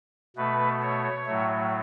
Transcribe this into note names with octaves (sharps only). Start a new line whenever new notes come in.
B2 A3 B4
C#5
A2 F#3 A3